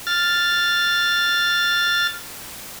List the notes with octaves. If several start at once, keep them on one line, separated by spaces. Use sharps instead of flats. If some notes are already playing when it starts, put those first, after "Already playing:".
F6 A6